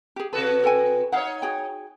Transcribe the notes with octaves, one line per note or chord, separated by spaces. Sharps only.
G4 G#4
C3 F#4 A4 B4
A4 G5 G#5
D#4 C#5 F5 F#5
F#4 G#4 G5